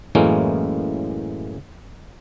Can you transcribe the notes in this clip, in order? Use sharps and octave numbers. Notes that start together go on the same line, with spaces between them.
F#2 A2 E3 G#3 A#3 C#4